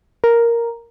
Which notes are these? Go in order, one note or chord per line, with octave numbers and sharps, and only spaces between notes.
A#4